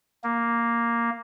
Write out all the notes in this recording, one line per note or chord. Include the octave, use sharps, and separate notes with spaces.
A#3